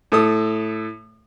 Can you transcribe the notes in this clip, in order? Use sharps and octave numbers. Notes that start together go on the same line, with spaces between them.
A2 A4 D#6